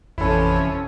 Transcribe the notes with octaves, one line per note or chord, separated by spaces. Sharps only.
A1 F2 C3 E3 F3 C#4 E4 A4